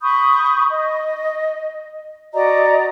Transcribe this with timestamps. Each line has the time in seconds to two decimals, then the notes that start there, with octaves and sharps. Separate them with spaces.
0.02 B5 C#6 D#6 G6
0.69 D#5
2.33 F#4 D5 D#5 A#5